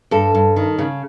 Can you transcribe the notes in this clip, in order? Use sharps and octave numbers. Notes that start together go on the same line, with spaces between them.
G2 A4
G2
D#3
C#3